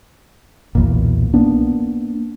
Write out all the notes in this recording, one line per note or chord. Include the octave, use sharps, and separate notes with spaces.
B1 E2 A#2
A#3 B3 D4